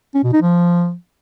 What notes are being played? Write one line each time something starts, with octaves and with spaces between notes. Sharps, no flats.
C#4
B2
D#4
F3